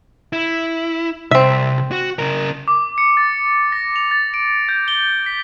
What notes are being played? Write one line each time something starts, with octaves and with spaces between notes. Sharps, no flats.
E4
C2 C4 E5
F#4
C#3 A#4
D6
C#7
A6
A#6
F7
A6
D7
G6
G7
B6